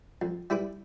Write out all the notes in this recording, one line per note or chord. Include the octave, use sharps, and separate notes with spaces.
F2
G3 E4 B4 D6